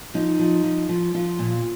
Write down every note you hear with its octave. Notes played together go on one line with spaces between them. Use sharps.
F3 D#4
F3
F3
F3
F3 F4
A#2